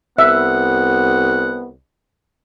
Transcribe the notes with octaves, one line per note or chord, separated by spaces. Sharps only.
C2 B3 E5 F#5